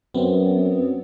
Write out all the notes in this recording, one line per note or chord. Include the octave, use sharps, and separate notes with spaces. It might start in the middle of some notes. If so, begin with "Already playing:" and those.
F#2 B3 C4